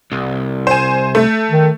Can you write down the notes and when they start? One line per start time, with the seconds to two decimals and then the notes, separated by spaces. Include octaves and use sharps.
0.12 C2
0.67 C5 G#5
1.15 A3
1.51 D#3